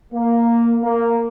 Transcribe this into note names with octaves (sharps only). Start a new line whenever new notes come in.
A#3
A#3